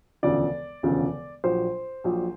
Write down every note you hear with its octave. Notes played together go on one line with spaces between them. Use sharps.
E1 D2 C#3 F3 D5
E1 D2 C#3 F3
A#1 A#2 F#3 C5
A#1 A#2 F#3